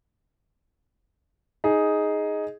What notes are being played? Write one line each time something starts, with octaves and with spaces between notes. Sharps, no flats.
D#4 G#4